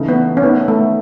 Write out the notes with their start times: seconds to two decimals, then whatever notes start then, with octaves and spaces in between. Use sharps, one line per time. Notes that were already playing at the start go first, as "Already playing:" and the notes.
Already playing: C#3 E3 A3 D#4
0.08 B3
0.37 C#4
0.42 D#3 A3 B3 D#4 A4
0.68 A3